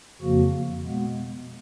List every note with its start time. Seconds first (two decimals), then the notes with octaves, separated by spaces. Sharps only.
0.21 F2 C#3 F3 A#3 F#4
0.83 B2 G#3 B3